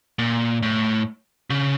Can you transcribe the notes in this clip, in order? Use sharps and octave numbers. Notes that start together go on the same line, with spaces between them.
A#2
A2
C#3